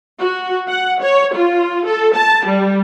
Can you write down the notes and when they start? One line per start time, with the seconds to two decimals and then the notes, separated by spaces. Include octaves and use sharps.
0.20 F#4
0.68 F#5
1.02 C#5
1.35 F4
1.87 A4
2.16 A5
2.46 G3